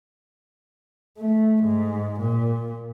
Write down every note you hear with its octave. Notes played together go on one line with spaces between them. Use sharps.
A3
G#2
A#2